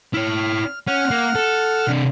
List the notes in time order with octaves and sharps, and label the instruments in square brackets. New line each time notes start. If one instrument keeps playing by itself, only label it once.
[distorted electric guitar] E4 C#5 [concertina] F6
[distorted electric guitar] C#4 [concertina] F#5 F6
[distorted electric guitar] A#3
A4
C3 D4